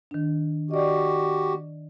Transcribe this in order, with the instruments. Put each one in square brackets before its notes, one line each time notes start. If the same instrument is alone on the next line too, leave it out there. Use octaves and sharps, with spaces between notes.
[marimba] D#3 D4
[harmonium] F#4 G4 [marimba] D5 D#5